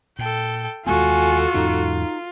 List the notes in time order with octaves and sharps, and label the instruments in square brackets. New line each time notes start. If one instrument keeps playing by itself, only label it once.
[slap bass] A#2 [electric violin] A4 G5
[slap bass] D#2 G#3 B3 [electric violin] F4 [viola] F#4 A4 [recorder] G#5
[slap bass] E2 G#2 C#4 [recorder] D#4